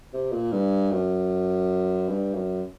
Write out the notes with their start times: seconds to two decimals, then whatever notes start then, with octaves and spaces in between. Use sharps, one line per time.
0.13 C3
0.32 A#2
0.52 G2
0.91 F#2
2.09 G2
2.34 F#2